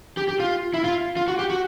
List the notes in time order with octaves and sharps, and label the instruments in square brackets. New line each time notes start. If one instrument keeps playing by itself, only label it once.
[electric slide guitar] G4
G4
F4
E4
F4
F4
F#4
G4
F#4